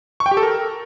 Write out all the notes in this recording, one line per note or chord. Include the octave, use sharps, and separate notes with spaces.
C#6
G5
G4
A4
A#4